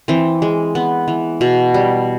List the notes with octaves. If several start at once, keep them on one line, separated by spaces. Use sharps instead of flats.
E3 C4
G#3
B3
E3
B2
G3